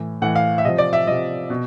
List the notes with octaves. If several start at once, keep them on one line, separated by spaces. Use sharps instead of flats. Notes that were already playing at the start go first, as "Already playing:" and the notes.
Already playing: A2 E3
A2 E3 F#5
F5
E5
C3 F3 D#5
D5
E5
C3 F3 D#5
B2